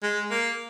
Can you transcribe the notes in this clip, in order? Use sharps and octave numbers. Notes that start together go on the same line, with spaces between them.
G#3
A#3